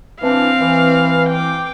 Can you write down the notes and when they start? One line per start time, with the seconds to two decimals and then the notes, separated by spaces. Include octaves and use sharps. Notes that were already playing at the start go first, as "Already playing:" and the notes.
0.22 E3 C4 D4 F5
0.62 E3
1.29 G5 D6